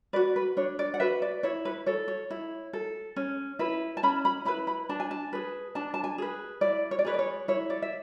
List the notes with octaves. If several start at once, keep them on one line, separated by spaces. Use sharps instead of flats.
F#4 B4 D5
B4
D4 C#5
D5
F#5
F#4 B4 E5
D5
E4 C#5
B4
A4 C#5
C#5
E4
A4
C#4
E4 B4
A5
C#4 B5
B5
E4 B4 B5
B5
D4 A5
G#5
A5
G#4 B4
D4 A5
A5
G#5
G#4 B4
E4 D5
C#5
D5
G#4 B4 C#5
D5
C#5
E4 C#5
D5
E5